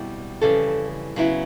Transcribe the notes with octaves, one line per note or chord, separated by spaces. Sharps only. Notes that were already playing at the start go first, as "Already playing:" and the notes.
Already playing: B2 G3 C4 E4
F2 C#3 E3 G3 A4
C#3 F#3 B3 E4